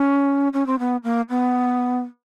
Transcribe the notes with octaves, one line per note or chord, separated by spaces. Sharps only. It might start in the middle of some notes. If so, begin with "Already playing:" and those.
Already playing: C#4
C#4
C4
B3
A#3
B3